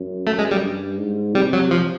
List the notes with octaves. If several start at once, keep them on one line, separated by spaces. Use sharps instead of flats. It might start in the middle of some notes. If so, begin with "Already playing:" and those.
Already playing: F#2
A3
G#3
G3
G2
G#2
C3 G3
F#3
F3